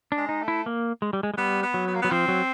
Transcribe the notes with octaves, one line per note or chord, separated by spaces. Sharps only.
D4
G#3
D#4
A3
E4
A#3
G#3
G3
G#3
G#3
G3 B3
B3
F#3
B3
A#3
F#3 B3
F3 C4
F#3